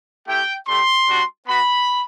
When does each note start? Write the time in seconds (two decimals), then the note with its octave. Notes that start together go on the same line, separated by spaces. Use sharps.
0.28 A3 E4 G4 G5
0.68 A3 D4 G4 C6
1.08 G3 D4 F#4
1.47 B3 F#4 B5